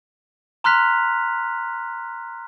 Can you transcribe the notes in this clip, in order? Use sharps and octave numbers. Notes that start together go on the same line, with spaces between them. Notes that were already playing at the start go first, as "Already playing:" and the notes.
A#5 C6 F6 F#6 B6 F7